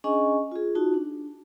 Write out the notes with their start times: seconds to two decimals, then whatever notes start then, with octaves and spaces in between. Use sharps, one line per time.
0.04 C#4 D4 G#4 D#5 G#5 C#6
0.52 F4 G#4
0.75 D#4 F4 F#4 A5
0.94 D4